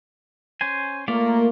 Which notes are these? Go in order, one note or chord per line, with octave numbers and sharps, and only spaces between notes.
C#4 C5 G#5
A3 A#3 F4 D5